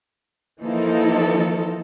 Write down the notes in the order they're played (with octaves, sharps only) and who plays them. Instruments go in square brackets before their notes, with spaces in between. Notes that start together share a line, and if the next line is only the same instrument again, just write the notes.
[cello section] E3 F3 A#3 D#4 A4